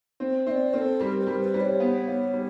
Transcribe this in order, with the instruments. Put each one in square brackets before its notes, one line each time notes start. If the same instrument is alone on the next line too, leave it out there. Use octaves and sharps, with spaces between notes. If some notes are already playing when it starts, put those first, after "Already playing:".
[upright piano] C4
[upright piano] C4 [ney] D5 E5
[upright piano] C4 [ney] A4 A#4
[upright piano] G3 [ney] A#4
[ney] B4
[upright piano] G3 [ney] A#4
[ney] B4
[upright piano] G3
[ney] D5
C#5
[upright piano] B3
B3
G3